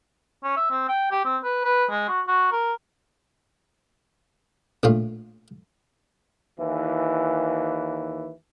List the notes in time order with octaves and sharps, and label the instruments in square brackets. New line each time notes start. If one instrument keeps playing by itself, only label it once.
[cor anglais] C#4
E5
C4
G5
G4
C4
B4
B4
G#3
F#4
F#4
A#4
[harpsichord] A#1 A2 F4
[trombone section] D#2 E3